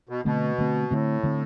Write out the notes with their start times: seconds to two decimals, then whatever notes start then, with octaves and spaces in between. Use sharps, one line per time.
0.09 B2
0.25 B2 D3 A3 C4
0.58 D3 A3 C4
0.90 A2 D3 A3 C4
1.23 D3 A3 C4